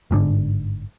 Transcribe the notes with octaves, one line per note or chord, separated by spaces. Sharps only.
G1 G#2 D3